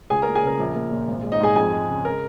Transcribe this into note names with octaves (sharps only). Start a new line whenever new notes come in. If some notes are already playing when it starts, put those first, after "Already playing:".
C#2 G#4 G#5
A#4 A#5
A#3
G#4 G#5
C#3 A#4
A#1
A#3
A#2
G#1
G#3
D#4 D#5
G#2 G#4 G#5
F2 G#4 G#5
G#3
C#3
A#4